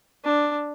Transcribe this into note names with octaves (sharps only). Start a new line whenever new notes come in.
D4